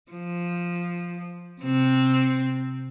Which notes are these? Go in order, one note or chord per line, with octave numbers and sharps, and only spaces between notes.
F3
C3 C4